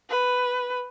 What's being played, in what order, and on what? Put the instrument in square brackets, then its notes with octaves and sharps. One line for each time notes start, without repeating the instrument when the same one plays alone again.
[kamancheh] B4